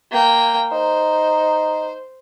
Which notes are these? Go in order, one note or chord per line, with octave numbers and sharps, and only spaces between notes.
A#3 G5
D#4 C5